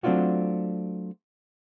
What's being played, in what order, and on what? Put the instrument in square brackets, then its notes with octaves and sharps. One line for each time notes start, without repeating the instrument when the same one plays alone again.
[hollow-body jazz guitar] F#3 A3 C4 D4 F4 F#4